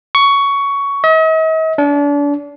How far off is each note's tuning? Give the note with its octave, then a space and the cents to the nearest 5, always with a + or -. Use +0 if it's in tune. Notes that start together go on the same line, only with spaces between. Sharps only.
C#6 +15
D#5 +45
D4 -35